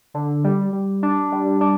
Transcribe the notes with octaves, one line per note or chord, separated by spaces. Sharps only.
D3
G3
G3
D4
G3
D4